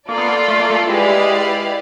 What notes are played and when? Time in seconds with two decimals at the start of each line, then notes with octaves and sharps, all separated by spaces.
0.09 A#3 F4 A4 D5
0.18 B3
0.27 A#3
0.48 A3
0.60 A#3
0.70 A3
0.89 G#3 E4 G4 B4 D5 F5